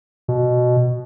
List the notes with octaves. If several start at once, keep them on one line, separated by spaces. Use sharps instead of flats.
B2